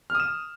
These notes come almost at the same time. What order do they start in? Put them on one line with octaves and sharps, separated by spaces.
F6 D#6 E7